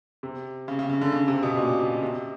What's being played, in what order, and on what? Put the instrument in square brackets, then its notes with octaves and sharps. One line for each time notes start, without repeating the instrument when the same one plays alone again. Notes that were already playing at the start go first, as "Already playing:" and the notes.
[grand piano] C3
C#3
C#3
C#3
D3
C#3
C3
B2
A#2
B2
C3